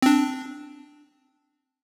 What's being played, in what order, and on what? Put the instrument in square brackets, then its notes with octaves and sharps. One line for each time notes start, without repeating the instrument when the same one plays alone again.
[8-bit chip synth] C4 D4